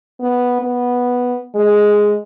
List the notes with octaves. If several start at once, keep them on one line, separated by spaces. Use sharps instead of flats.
B3
B3
G#3